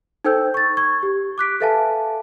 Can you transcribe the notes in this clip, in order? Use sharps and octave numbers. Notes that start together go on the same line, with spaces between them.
D#4 A4 C5 G5 E6 G6
C#6 A6
C#6 G#6
G4
D6 F#6 B6 D7
A4 B4 E5 F5 G#5 A5